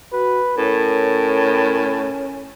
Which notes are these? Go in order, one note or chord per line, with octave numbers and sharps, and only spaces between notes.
F#4 B4
A2 C#4 A#4